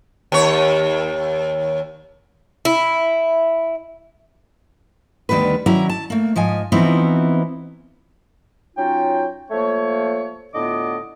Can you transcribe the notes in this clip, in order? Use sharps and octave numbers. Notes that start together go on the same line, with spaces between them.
D#2 C#5
E4
D2 D#3 G3 B3 B4
D#3 F#3 C#4 E4 D5 A#5
A5
A3 A#3
G#2 F3 D#5 G#5
E3 F3 B3 C4 D#4 E4
F#3 C#4 D#4 F4 G5
F3 A3 A#3 C#5
A2 D3 B3 F4 D#5 D6